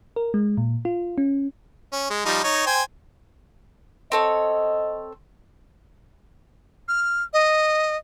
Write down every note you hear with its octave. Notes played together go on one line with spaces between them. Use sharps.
A#4
G#3
A#2
F4
C#4
C#4
G#3
F3 G3 D#4
D#4 C#5
C5 G5 G#5
C4 A4 C#5 D#5
F6
D#5